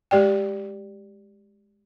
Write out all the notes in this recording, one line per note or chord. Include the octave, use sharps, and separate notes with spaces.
G#3 G4 D5 G5